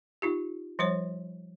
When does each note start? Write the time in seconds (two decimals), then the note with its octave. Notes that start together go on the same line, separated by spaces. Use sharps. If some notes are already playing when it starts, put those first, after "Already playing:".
0.22 D#4 F4 G4
0.79 F3 G3 C5 C#5